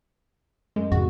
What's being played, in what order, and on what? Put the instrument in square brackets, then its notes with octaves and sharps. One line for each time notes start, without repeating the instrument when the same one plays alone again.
[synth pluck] F#2 G#3
[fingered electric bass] F2 G#2 C3 [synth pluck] F#4